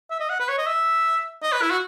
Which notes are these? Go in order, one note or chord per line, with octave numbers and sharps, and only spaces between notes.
E5
D#5
F#5
B4
C#5
D#5
E5
D#5
B4
E4
F#4